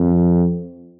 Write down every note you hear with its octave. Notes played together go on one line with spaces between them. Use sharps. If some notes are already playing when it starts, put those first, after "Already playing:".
Already playing: F2